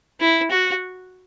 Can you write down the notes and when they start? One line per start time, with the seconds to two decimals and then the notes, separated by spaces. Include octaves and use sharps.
0.20 E4
0.51 F#4